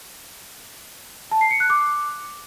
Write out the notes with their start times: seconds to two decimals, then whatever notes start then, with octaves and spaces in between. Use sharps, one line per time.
1.31 A5
1.41 C7
1.51 C#7
1.60 F#6
1.70 D6